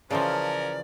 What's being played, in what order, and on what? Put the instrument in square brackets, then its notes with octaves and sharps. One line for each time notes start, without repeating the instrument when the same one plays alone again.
[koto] C#3 E3 F3 [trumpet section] C#4 A#4 [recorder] D5 [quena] A5